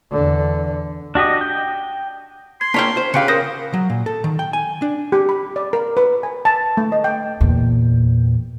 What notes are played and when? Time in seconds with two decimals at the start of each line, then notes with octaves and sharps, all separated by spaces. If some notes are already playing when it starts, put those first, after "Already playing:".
0.12 E2 D3
1.15 D4 F#4 G4 D#5
1.41 G5
2.61 C6 G#6
2.74 A#3 D4 F4 C#5 G5 B6
2.97 C5
3.14 C#3 F4 G4 B4 F5 C#7 D7
3.28 A#4 C5 D#6 A#6
3.74 F#3
3.90 A#2
4.06 A4
4.24 D#3
4.39 G5
4.53 G#5
4.82 D4
5.12 G4
5.29 B5
5.56 D5
5.73 A#4
5.97 B4
6.23 G#5
6.45 A5
6.77 A3
6.92 D#5
7.04 G5
7.41 E2 A#2